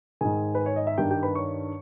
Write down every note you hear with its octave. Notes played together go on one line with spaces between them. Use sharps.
G#2 D#3 G#4 G#5
B4
C#5
D#5
E5
G2 D#3 G4 G5
G4 G5
B4 B5
C#5 C#6